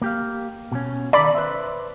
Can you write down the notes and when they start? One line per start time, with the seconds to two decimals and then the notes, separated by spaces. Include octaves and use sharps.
0.02 A#3 G4 F5
0.72 B2 C#4
1.13 D#3 D#4 A4 D5 B5
1.35 B4 C5 E5